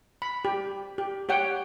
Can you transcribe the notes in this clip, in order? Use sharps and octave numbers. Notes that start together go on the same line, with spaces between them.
B5
G4
G4
G4 C#5 F#5 G5